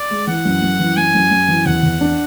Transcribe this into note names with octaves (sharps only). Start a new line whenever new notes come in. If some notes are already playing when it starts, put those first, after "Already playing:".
Already playing: D5
G#3
E3 F#5
F#2
F#2
E3
F#2 G#5
F#2
F#2
E3
E2 F#5
E2
D4